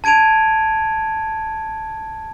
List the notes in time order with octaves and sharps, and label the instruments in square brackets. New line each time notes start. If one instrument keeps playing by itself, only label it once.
[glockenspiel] A5 G#6 D7 D#7 F7